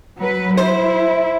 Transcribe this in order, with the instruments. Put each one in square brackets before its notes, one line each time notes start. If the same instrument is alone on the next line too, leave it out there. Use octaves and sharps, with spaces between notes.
[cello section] F#3 B4
[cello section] E4 [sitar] C5